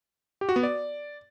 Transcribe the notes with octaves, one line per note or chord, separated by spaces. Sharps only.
G4
F#4
B3
D5